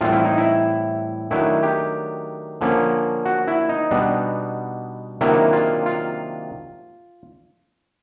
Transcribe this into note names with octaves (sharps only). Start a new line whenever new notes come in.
A2 E3 G3 C4 F4
E4
D#4
E4
D#3 F#3 A3 D4 E4
G4
D3 F3 A#3 C#4
F#4
E4
D#4
B2 G3 B3 D4
C3 D#3 F#3 A#3 D4 E4
F4
F4